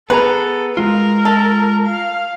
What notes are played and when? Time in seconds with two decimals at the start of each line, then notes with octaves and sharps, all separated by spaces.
0.10 B3 G#4 A4 B4 A#5
0.77 G#3 F4 A#4
1.25 A4
1.85 F5